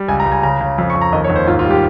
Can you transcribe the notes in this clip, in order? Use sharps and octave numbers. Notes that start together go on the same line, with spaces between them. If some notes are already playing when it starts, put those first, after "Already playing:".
Already playing: G3
C#2 G#5
A#5
C#2
G#5
C#3 A#5
C#3
F2
C#6
F2
A#5
D#2 D#5
C#5
D#2
C5
G#2 F4
F4
G3
G4